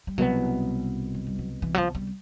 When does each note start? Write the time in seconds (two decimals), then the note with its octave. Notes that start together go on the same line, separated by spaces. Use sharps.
0.07 G3
0.18 C2 B2 F#3 G#3 B3
1.14 F#3
1.27 G3
1.39 F#3
1.62 E3
1.74 F#3
1.78 F3
1.95 G3